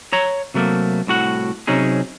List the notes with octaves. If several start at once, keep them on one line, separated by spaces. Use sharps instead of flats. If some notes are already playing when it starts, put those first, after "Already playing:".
C#5 A#5
C3 F#3 A3 A#3
C2 A2 F#4 F#5
C3 F#3 C#4 D#4 G#4